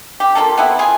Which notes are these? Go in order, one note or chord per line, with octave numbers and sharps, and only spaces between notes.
G4
F3 G3 A#3 A4
B3 C4 E4
F4 G#4